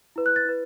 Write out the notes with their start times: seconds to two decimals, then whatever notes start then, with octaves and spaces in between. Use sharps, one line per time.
0.16 E4 B4
0.26 F#6
0.36 A6
0.45 E4 B4